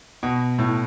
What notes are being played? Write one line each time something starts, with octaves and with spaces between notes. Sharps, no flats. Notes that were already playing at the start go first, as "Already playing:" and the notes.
B2
A2